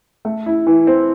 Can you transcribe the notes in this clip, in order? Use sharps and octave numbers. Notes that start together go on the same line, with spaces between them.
A3
E4
E3
C4